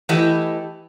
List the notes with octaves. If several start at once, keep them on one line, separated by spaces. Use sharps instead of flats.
E3 A3 E4 G4 D#5